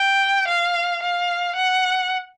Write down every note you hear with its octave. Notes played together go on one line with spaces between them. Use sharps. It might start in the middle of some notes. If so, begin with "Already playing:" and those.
Already playing: G5
F5
F5
F#5